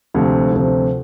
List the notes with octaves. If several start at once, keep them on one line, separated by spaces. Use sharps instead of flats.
D2 C3 F3
D2 C3 F3